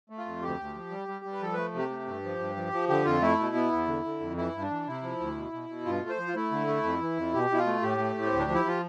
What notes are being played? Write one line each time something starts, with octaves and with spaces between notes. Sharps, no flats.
A3
F4
F2
D2 G4
D2
F3
G3
G3
G3
B4
F3 A4
A3 B4
C3 G4
A3
G2
F3
G2
F3
F3
D3 G4
F2 F4
A3 E4
B2
B3
E2
D3
D3
F2
E3 E4
G2
D4
E3
C3 E4
F3
D2
B2
B2
B2
G2 F4
A3
C5
F3
F4
A3 E4
D3
A3
F2
E3
F2
B2 G4
B2 E4
F4
A3
A2 G4
A3
A2
C4
D2
D4
F3
E4
F3 F4